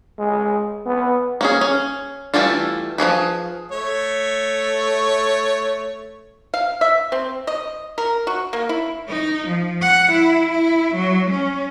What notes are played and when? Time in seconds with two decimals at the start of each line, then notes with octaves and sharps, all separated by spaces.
0.19 G#3
0.86 B3
1.41 A#3 C#4 G#4
1.61 C#4
2.34 E3 G3 A3 E4 F4
2.98 F3 A#3 G#4 B4
3.71 A3 C#5
6.54 F5
6.81 E5
7.12 C4
7.47 D#5
7.98 A#4
8.27 F#4
8.53 A#3
8.69 E4
9.08 D#4
9.48 F3
9.82 F#5
10.13 E4
10.52 E4
10.95 F#3
11.31 C#4